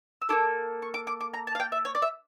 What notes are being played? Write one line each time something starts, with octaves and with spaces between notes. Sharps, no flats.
E6
A#3 E4 A4 D6
C#6
D6
D6
D6
A#5
A5
F5
G5
E5
C#5
D5
E5